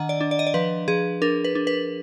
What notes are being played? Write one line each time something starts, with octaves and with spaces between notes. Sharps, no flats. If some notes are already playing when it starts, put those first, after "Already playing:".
Already playing: D#3 D4 D#5 F#5
D5
D4
D5
D#5
D5
F3 B4
F3 G#4
D4 A#4
B4
D4
B4